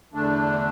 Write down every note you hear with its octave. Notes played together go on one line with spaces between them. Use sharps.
E2 D3 A3 D4